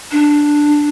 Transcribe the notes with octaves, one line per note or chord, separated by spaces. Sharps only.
D4